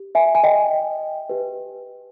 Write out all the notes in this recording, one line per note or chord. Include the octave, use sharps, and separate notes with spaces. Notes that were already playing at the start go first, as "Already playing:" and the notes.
Already playing: G4
E5 G#5
G#5
D#5 G5
G4 B4